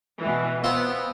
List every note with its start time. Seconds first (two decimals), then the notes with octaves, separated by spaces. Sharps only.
0.20 B2 E3
0.64 B3 C4 F4